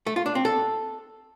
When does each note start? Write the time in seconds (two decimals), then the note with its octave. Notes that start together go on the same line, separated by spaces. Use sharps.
0.07 A3
0.16 F4
0.26 D4
0.35 C4
0.45 A4